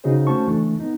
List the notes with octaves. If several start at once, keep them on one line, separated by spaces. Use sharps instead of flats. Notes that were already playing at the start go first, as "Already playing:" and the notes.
C#3 D#4 F#4 G#4 C5
A3 C#4 F#4 C5 A5 C#6
C#2 E3 A3 D4
B3 D#4